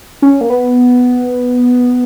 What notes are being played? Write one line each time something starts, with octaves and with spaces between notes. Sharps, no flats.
C#4
A#3
B3